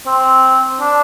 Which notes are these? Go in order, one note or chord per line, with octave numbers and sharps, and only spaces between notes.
C4
D4